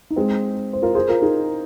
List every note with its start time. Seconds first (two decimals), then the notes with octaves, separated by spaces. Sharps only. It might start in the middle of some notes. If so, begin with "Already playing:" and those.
0.10 D#4
0.16 G#3 C4
0.73 C5
0.82 F4 A#4
0.95 G#4 C5
1.08 F4 A#4
1.22 D#4 G#4